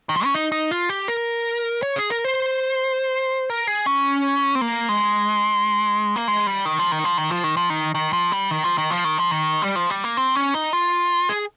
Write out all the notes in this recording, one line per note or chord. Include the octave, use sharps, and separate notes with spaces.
D#3
F3
C#4
D#4
D#4
F4
G4
A#4
C#5
G#4
A#4
C5
A#4
G#4
C#4
C4
A#3
G#3
A#3
G#3
G3
D#3
F3
D#3
F3
D#3
F3
D#3
F3
D#3
D#3
F3
G3
D#3
F3
D#3
F3
D#3
F3
D#3
G3
F3
G3
A#3
C4
C#4
D#4
F4
G#4